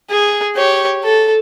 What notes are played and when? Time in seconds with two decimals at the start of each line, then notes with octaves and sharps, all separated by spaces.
0.11 G#4
0.56 G4 C#5
1.04 A4